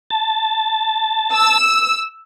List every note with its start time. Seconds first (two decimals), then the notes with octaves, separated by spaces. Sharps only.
0.11 A5
1.34 E6